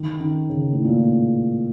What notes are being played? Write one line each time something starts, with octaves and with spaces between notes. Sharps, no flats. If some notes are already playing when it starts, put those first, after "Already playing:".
Already playing: D#3
D#3
C#3
A2
A#2